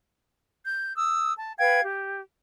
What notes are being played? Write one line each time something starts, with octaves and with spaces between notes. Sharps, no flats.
G6
D#6 E6
A5
B4 F5 G5 G#6
G4